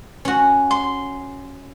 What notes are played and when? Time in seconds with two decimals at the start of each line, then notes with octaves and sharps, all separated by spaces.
0.25 C#4 F#4
0.71 C6